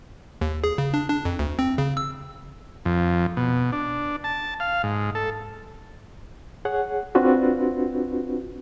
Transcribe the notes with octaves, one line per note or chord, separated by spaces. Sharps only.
D#2
G#4
C#3
D4
D4
F2
D2
C4
C#3
E6
F2
B2
D4
A5
F5
G#2
A4
G#4 C#5 F#5
C4 D4 F4 F#4 B4